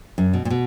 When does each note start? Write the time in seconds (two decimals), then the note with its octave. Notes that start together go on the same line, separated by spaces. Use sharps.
0.18 F#2
0.33 B2
0.45 A#2
0.50 B2